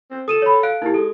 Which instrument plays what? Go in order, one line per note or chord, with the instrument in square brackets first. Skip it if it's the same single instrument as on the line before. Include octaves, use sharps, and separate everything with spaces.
[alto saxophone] C4
[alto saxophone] A4 [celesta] D#6 D#7 E7
[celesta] C#5 B5
F5 F#6 D7
[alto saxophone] A#3 [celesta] D#4 E4 G4
[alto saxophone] G#3 [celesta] A4